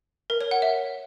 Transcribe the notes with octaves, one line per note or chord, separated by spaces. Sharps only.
A#4
C#5
F#5
E5